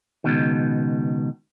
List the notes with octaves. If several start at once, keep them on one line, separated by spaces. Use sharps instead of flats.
C#2 G#2 B2 D#3